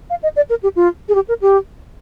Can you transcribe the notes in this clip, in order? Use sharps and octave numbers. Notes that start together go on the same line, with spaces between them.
F5
D#5
D5
A#4
G4
F4
G#4
G4
A#4
G4